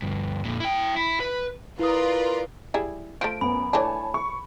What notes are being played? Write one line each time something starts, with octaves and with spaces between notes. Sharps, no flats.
D2 G2
F2 A#2
E4 G5
E4
B4
E4 F4 A#4 B4 D5 D#6
G3 E4 G#4
F3 A3 D7
F#2 B3 B5
E3 A3 D4 C#5 G#5 A5
C#6